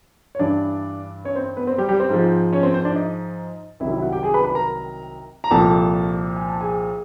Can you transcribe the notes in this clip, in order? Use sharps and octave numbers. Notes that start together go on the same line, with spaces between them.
C#5
G2 E3 D4 D5
C#4 C#5
C4 C5
B3 B4
C4 C5
G3 G4
G3 G4
C4 C5
G#2 F3
C#4 C#5
C4 C5
C4 C5
D4 D5
D#4 D#5
C2 C3 D#3 F#3 E4 E5
E4 E5
F#4 F#5
G4 G5
G#4 G#5
B4 B5
B4 B5
A#4 A#5
A#5
C2 A#2 F3 A4 A5
G#5
A5
G#4 G#5